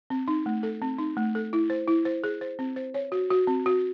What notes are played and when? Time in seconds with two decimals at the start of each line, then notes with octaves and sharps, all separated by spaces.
0.10 C4
0.28 D#4
0.46 A3
0.63 A4
0.82 C4
0.98 D#4
1.17 A3
1.35 A4
1.53 E4
1.70 C5
1.88 E4
2.05 C5
2.24 G#4
2.41 C5
2.59 C4
2.76 C5
2.94 C#5
3.12 F#4
3.31 F#4
3.47 C4
3.66 F#4